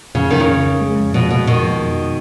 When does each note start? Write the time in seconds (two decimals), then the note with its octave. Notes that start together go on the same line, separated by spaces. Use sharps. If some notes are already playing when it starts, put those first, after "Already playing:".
0.15 F2 C#3
0.31 F2 D#3
0.40 C#3
0.48 F2
0.65 F2
0.81 G#3
0.98 F2
1.14 B2 F3
1.31 B2 G#3
1.47 F2 B2 D#3
1.63 F3
1.81 F2